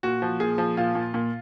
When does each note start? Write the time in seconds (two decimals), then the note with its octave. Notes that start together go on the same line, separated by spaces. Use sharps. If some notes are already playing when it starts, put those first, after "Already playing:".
0.03 A#2 F#4
0.22 F3
0.40 A#2 G#4
0.58 F3
0.77 A#2 F4
0.95 A#2
1.14 A#2